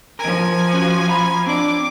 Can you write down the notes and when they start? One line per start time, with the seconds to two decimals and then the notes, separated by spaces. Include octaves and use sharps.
0.19 F3 A#4 G#5
0.73 C#4 F#4
1.08 F5 A#5 B5
1.47 C4 D4 D5 D6